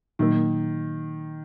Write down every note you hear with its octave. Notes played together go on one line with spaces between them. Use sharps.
A#2 D#3 F#3 A#3